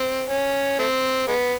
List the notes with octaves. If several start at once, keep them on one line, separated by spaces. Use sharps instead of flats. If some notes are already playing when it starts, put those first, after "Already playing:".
Already playing: C4
C#4
A3 C4
G#3 B3